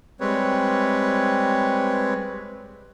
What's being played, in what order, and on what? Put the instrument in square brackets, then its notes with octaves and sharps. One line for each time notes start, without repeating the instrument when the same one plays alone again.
[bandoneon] G3 G#3 C4 B4 C#5